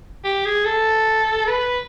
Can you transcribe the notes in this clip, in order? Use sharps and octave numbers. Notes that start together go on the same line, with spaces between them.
G4
G#4
A4
B4